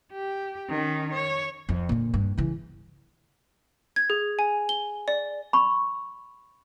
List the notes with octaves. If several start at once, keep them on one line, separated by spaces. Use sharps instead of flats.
G4
D#3 C#4
C#5
F2
A#2 D3
G2
C#3 E3
G#6
G#4
G#5
G7
D5
B5 C#6